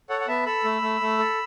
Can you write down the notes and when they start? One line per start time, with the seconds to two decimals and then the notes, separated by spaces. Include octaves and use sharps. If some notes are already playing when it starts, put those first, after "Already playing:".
0.10 A4 C#5 F#5
0.21 F#5
0.28 B3 E5 A5
0.46 A4 B5 E6
0.64 A3
0.82 A3
1.01 A3
1.19 A4